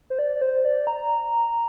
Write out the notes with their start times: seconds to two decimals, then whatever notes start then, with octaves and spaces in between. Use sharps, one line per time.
0.10 C5
0.19 D5
0.36 D5
0.41 C5
0.65 D5
0.87 A#5